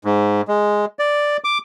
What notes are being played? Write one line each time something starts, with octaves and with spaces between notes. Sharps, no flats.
G#2
G#3
D5
D6